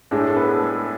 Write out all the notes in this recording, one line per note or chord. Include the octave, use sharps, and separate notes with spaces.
A2 G#3 D4 D5
A4
B3 B4
A4
G#3 G#4